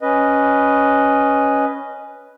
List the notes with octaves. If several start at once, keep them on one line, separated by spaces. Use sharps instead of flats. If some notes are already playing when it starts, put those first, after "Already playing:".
C#4 B4 D#5